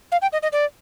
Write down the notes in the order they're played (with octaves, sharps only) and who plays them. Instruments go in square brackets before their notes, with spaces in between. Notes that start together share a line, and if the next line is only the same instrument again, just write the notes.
[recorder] F5
G5
D#5
D#5
D5